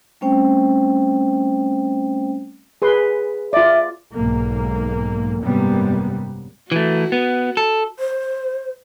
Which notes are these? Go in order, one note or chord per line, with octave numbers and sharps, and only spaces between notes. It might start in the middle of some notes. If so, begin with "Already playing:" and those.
G3 A3 C4 C#4 C5 G5
G#4 B4 C6
F4 D5 E5
B1 G#2 A#3
G#1 F#2 C3 G3 A#3 B3
E3 A3 F#4
B3
A4
C5